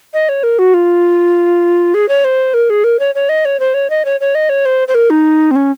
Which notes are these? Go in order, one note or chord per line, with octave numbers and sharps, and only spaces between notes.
D#5
C#5
A#4
F#4
F4
G#4
C#5
C5
A#4
G#4
A#4
C#5
C#5
D#5
C#5
C5
C#5
D#5
C#5
C#5
D#5
C#5
C5
C5
A#4
D#4
C4
C#4